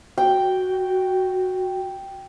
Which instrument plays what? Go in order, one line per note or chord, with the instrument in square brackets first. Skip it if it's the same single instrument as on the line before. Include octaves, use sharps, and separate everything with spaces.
[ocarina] F#4 [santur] G5